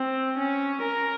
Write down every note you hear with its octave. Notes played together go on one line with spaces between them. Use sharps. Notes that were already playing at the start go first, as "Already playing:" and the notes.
Already playing: C4
C#4
A#4